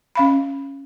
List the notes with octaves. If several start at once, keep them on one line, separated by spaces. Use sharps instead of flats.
C#4 F5 B5